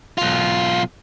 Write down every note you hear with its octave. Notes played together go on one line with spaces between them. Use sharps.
B1 F4